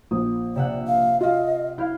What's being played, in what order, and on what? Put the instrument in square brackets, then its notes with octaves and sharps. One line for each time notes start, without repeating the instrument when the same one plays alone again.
[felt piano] A#1 [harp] D#6
[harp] C3 E5 F#5 [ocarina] D5
[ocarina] F5
[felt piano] F4 F5 [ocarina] D#5
[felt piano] E4 [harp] F5 F6 G6